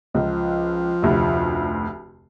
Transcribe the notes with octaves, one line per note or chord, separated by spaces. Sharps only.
C#2 F3
F1 D2